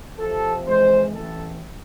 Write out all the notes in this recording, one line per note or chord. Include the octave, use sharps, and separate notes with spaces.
F2 C3 F3 A4
F2 E3 G#3 C5
A1 A2 E3 A4